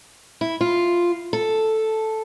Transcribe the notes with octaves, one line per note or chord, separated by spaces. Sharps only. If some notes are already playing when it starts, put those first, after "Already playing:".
E4
F4
A4